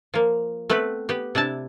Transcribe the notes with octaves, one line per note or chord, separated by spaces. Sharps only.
F3 A#3
A3 B3 C4 B4
B3 G4
C3 D4 E4 A5